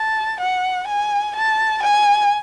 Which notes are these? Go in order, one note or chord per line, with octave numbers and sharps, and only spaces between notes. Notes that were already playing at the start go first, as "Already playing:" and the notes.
Already playing: A5
F#5
G#5
A5
G#5